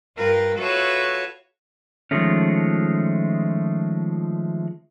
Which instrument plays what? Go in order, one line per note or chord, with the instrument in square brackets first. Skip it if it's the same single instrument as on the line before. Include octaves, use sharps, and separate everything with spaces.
[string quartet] G2 F4 A#4 B4 G5
F4 F#4 A4 B4 C#5 E5
[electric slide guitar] D#3 F3 G#3 A3 C#4